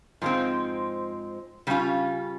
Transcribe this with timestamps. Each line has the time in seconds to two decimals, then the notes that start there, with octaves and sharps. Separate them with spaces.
0.22 G#2 F3 G#3 C4
1.67 C#3 G3 C#4 F4